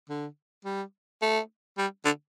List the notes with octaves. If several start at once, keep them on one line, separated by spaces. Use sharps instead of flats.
D3
G3
A3
G3
D3